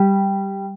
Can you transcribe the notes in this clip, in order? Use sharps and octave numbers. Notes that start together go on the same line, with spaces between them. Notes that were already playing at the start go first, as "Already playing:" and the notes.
Already playing: G3